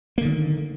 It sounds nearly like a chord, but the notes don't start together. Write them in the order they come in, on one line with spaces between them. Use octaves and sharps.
A#3 D3 D#3